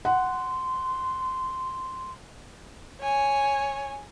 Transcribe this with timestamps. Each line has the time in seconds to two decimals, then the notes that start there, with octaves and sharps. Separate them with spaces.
0.05 F#5 C6
3.01 C#5 G#5